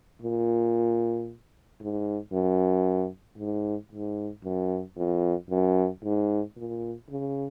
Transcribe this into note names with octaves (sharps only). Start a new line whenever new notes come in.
A#2
G#2
F#2
G#2
G#2
F#2
F2
F#2
G#2
A#2
C#3